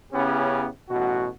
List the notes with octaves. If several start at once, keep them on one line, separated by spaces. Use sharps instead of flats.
C#3 B3 C#4 E4 G4
A1 B2 F#4